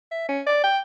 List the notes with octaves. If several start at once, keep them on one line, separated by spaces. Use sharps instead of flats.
E5
C#4
D5
G5